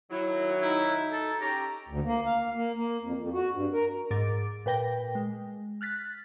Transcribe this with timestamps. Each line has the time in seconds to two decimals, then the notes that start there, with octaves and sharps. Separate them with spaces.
0.11 D#3 F#3 E4
0.62 D#4 E4
1.12 A4
1.41 C#4 G4 A#5
1.89 D2
2.05 A#3
2.26 F5
2.55 A#3
2.76 A#3
3.03 F2
3.19 F2
3.34 F#4
3.53 G2
3.73 A#4
4.11 G#2 A#4 D6 A6 D7
4.66 A#2 B4 G5 A#6
5.15 G#3
5.81 F6 F#6 A6 B6